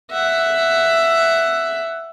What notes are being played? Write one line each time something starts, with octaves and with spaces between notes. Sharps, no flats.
E5 F#5